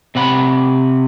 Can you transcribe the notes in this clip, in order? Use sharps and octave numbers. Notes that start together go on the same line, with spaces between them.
C3 C4 F#5 B5